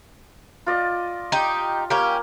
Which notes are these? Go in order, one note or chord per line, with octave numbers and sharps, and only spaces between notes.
F4 D5 D#5
D#4 G4
A#3 C#4 G4